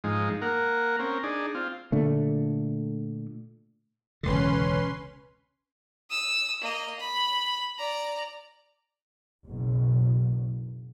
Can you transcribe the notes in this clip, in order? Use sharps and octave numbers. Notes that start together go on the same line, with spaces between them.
G#2 F3 G#3 D#4
A#3 A#4 F#5
C4 C#4 A#4
D4 D#4 G#4
C4 F4
A#2 D3 A3
E1 C#2 D3 C#4 B4 C6
D#6 E6
A#3 D#5
B5
D5 A#5
F#1 B1 B2